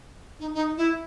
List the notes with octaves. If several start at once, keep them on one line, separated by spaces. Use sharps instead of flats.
D#4
D#4
E4